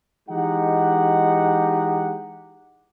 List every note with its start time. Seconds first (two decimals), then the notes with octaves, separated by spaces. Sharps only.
0.29 E3 G#3 D#4 G4 F#5